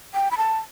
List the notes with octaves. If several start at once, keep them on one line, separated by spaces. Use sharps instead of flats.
G5
B5
A5